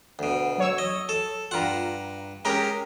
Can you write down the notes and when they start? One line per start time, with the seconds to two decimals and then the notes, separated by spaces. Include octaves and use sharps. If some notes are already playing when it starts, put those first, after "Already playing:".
0.19 D2 B2
0.58 F#3 C#5 E6
0.78 D#5
1.09 A4
1.51 G2 F4 F#5 A#5
2.45 G#3 C#4 G4 A#4 A#5